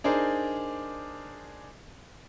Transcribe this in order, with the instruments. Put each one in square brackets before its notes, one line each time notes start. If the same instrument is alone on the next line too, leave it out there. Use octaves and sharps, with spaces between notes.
[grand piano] D4 D#4 G#4 A#4 C5 D5